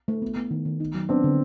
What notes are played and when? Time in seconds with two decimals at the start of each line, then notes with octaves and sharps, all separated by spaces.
0.08 A3
0.22 B3
0.36 B3
0.51 D#3
0.65 D#3
0.80 D#4
0.94 F#3
1.09 B3 C4 D4
1.24 D3